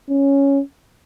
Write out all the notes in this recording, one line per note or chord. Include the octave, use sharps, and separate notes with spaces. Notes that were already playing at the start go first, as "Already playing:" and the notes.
C#4